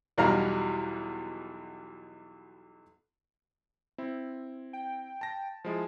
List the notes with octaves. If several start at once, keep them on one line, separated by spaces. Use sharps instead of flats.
B1 E2 B2 G3 F5 A#5
C4 E4
G5
A5 A#6
F3 G#3 E4